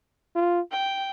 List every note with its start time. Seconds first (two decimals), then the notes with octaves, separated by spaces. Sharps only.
0.36 F4
0.71 G5